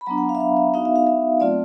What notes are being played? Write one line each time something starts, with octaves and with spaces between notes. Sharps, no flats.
B5
F#3 B3 D4 A#5
F#5
F5
E5
F5
E5
B3 D#4 F#4 F5
E5
F5
E5
F#3 A3 C4 F4 D5